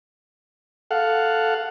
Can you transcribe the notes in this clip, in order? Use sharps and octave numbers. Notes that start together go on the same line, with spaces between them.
A4 F5 F#5